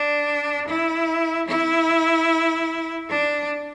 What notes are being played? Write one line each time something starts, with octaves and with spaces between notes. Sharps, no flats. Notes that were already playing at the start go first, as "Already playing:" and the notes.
Already playing: D4
E4
E4
D4